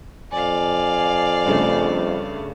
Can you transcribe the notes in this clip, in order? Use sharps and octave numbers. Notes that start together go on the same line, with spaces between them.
F2 D5 F5 G#5
G2 C#3 A3